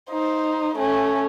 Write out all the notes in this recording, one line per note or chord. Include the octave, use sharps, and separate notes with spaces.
D#4 C5
A3 C#4